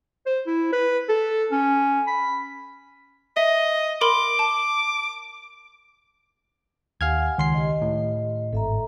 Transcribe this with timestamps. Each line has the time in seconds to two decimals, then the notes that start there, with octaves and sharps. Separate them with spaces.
0.26 C5
0.47 E4
0.72 B4
1.09 A4
1.52 C#4
2.07 B5
3.37 D#5 E5
4.01 A#4 B5 C6 D6
4.39 A5
7.01 D#2 G4 F5 F#5 G#5 F6 G#6
7.38 C#2 D#3 C6 C7
7.54 G4 D#5
7.82 A2
8.53 G#1 A4 E5 A#5